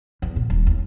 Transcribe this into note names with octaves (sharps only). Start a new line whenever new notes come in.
E2
A#2
D#1
D#2